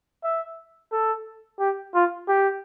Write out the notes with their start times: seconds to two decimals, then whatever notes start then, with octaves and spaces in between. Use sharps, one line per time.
0.24 E5
0.92 A4
1.59 G4
1.94 F4
2.28 G4